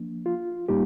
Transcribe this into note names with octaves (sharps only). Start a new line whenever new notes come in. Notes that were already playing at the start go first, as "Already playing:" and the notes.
Already playing: F3 A#3 D4
F4
A2 G3 A#3 D#4 G4